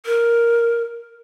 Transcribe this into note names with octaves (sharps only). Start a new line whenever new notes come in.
A#4